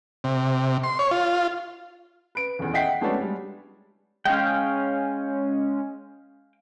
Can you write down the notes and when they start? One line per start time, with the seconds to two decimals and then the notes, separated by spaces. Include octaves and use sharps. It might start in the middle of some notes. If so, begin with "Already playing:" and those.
0.24 C3
0.84 C6
0.99 C#5
1.11 F4
2.35 B4 D7
2.59 D#1 E2
2.74 D#5 E5 F#5 G5 B6 C7
3.01 G#3 A3 B3 C#4 D4 F#4
3.19 G3 G#3
4.25 G#3 C#4 F5 G5